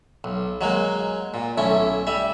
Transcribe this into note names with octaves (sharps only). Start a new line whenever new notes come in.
B1
F#3 G#3 A#3
A#2
B1 A3 C#4 E4
G3 E5